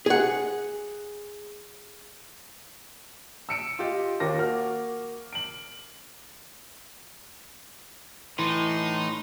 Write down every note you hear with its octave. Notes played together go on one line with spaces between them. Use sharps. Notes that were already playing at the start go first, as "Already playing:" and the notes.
G#4 F#5
E6 C#7 D7
F4 G4 D#5
D#2 A#3 D6 A#6
A#3 F#4 F6
D7 F#7
A2 E3 D#4 C6